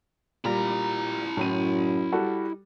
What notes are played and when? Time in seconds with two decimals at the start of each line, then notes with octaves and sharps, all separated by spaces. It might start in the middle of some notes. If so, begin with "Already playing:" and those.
0.44 A#2 G3 A#3 E4 A#5
1.37 F#2 A2 D#7
2.12 G3 F#4 A4